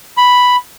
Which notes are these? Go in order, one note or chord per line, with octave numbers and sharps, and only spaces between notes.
B5